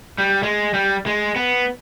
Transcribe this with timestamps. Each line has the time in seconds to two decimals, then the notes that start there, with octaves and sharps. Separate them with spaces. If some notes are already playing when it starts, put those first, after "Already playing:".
0.18 G3
0.43 G#3
0.74 G3
1.06 G#3
1.36 B3